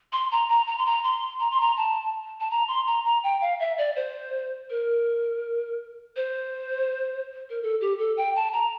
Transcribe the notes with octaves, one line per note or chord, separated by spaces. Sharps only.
C6
A#5
A#5
A#5
C6
A#5
C6
A#5
C6
A#5
A5
A5
A#5
C6
A#5
A#5
G5
F5
E5
D5
C5
A#4
C5
A#4
A4
G4
A4
G5
A5
A#5